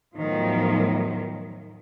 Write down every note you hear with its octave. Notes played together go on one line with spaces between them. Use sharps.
E2 A2 D#3 F3 F#3